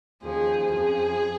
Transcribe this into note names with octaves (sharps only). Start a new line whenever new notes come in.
D#2 C#3 F3 G#4
F2 C#3 F3 G#4